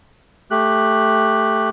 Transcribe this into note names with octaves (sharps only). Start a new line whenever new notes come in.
A3 G4 F#6